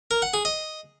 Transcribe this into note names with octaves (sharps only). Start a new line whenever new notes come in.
A#4
F#5
G#4
D#5